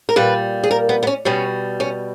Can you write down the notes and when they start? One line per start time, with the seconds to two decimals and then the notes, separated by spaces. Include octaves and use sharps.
0.09 A#4
0.16 A#2 G3 B4
0.63 G#4
0.71 A#4
0.89 B3
1.03 B3
1.07 C#4
1.25 B2 G3 C#4
1.80 C#4